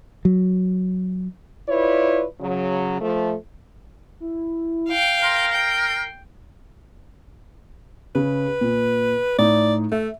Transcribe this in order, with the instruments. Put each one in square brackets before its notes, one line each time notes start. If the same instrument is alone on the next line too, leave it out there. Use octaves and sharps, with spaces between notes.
[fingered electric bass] F#3
[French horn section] E4 F4 B4 C#5 D5
C#3 F#3
F3 A3
[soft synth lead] E4
[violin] F5 G5
[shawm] A#4 [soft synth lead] C6
[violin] G5 [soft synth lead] C7
[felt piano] C#3 [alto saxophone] B4
[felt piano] A#2
[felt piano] A2 D#4 [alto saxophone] D5
[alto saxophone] A3 [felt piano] E5